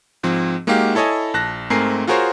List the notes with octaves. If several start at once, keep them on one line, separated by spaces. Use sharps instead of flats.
G#2 F3 C4
G#3 A#3 D#4 F#4 G4 F5
E4 A4 C#5 D#5 G#5
A#1 A5 F#6 A#6
G#2 A3 C4 A#4 G#5 C7
F4 F#4 G#4 A#4 C5 C#5